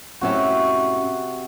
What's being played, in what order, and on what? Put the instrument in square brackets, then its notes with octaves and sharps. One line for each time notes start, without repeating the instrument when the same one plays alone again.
[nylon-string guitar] A2 C#4 E5 [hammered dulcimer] C3 F#4